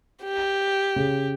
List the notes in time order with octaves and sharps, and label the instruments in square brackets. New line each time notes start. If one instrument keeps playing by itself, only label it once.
[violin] G4
[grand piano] C#3